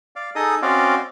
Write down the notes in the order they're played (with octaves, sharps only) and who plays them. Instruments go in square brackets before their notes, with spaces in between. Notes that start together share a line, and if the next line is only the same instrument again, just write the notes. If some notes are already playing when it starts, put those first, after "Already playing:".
[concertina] D5 F5
D#4 G#4 A4 D#5 D#6
C4 C#4 F#4 D5 D#5 F5